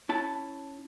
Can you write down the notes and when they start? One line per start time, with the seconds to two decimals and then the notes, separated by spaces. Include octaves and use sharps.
0.09 C#4 E4 A5